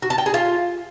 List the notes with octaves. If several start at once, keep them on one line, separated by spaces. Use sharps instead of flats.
F#4
A5
G5
G#4
F4